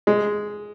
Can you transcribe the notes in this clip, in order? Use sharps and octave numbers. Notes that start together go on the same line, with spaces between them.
G#3